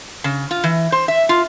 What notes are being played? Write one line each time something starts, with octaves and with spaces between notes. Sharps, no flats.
C#3
F4
E3
C5
E5
F4